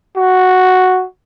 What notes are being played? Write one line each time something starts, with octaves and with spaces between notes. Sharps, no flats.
F#4